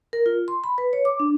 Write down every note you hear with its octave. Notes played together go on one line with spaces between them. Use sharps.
A#4
F4
C6
B5
B4
C#5
D6
D4